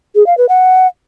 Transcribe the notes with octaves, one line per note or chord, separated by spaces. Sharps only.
G#4
F5
B4
F#5